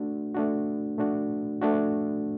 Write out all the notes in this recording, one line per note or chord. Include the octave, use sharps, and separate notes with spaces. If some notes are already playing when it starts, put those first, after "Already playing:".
Already playing: A3 D4 F#4
A3 D4 F#4
A3 D4 F#4
A3 D4 F#4